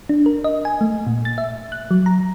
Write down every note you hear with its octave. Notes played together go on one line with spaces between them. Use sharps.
D4
A#4
D#5
G#5
A3
A#2
A6
E5
F#6
F#3
A#5